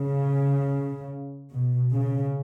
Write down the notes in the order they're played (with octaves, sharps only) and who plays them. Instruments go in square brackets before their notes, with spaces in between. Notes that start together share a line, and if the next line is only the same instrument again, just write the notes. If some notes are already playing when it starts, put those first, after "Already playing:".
Already playing: [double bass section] C#3
B2
C#3